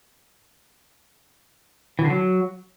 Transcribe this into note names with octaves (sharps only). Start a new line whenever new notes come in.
E3
D3
F#3